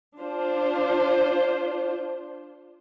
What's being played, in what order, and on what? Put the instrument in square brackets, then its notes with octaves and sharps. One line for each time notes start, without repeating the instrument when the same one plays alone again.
[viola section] D4 F4 C5